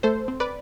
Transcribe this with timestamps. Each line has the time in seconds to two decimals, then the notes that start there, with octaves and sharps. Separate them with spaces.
0.03 A3 A4 C5
0.28 C4
0.40 B4 D5